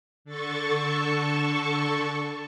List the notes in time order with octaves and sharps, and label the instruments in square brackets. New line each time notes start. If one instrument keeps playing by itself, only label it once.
[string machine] D3 A4 A5 C#6